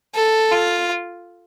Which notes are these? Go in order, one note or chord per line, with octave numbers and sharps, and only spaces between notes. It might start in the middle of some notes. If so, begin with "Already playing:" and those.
A4
F4